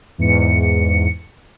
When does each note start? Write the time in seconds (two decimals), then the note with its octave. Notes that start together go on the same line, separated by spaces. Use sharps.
0.18 E2 G#2 C#7